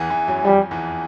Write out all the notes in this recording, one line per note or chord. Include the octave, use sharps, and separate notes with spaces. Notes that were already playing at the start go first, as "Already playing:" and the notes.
Already playing: E2 E3
E2 E3
F#2 F#3
F2 F3 G3
E2 E3